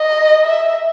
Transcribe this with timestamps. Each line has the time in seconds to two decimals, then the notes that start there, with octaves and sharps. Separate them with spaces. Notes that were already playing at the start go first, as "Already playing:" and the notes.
Already playing: D#5
0.47 E5